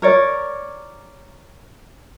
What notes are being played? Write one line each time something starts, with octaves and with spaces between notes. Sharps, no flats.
A#4 C#5 D5